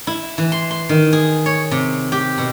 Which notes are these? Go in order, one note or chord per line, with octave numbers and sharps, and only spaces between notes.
E4
E3
C6
C6
D#3
G#4
C#5
C3
G4
B2